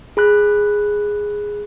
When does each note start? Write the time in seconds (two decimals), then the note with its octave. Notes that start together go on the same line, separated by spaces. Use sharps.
0.17 G#4 B5 F#6